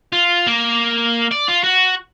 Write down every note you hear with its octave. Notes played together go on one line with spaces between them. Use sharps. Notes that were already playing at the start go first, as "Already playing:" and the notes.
F4
A#3
D5
F4
F#4